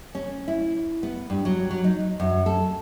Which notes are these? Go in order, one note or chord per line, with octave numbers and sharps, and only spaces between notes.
C#4
E4
B3
G2
F#3
F#3
D#4
F#2
A4